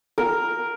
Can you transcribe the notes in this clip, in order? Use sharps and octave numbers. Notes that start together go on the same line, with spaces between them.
A#4